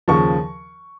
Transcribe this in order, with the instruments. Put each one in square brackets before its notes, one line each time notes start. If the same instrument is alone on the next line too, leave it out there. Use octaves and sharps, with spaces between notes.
[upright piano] D#2 C#3 F3 C#6